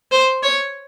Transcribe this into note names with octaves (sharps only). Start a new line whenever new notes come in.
C5
C#5